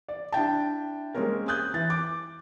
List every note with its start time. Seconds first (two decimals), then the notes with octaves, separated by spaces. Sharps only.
0.08 D5
0.32 D4 E4 G5 A5
1.15 G#3 A#3 C4 C#4 A#4
1.48 D#6 F#6 G6
1.74 E3 A6
1.90 D6